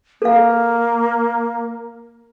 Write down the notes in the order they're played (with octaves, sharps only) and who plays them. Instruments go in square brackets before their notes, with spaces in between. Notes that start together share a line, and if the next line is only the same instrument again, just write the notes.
[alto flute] A#3 [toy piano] A4 F5